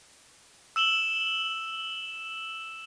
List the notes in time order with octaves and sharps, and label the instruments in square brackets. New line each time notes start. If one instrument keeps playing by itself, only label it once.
[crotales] E6 E7 F#7 G7